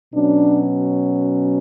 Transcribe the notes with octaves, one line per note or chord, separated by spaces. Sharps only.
B2 F#3 C#4 D4